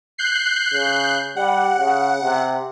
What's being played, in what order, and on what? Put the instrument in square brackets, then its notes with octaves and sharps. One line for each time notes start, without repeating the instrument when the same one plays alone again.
[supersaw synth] F#6 G6 C7
[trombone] C#3
[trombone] G3 [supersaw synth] F#5
[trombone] C#3
C3